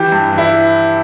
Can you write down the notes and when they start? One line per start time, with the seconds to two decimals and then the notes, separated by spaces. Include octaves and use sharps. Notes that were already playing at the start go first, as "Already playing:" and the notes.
Already playing: E3 G4
0.12 G2
0.33 E3
0.38 E4